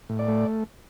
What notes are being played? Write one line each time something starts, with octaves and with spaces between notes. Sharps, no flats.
A2
D5
A3